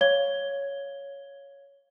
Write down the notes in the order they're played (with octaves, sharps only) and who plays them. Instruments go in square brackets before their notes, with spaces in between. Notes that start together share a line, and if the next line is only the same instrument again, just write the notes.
[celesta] C#5 F5 G#6 G7